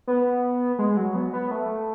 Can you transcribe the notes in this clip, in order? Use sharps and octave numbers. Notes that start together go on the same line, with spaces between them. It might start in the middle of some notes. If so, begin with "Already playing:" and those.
B3
G#3
F#3
B3
B3
A3